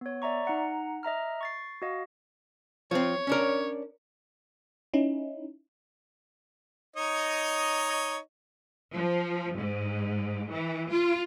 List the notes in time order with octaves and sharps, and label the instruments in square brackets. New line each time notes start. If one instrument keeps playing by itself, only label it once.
[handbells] B3 C#5
D5 E5 A#5 C#6
D#4 F#5 A#5
D#5 E5 A#5 F6
C#6 A6 C7
F#4 D#5 F5
[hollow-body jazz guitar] F3 C4 [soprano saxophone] C#5
[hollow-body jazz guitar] C#4 D4 A#4
[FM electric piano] C#4 D#4 E4
[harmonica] D#4 C#5 D#5
[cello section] F3
G#2
E3
F4